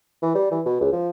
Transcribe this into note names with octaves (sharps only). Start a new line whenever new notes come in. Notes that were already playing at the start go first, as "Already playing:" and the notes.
E3
G3
E3
B2
C#2
F3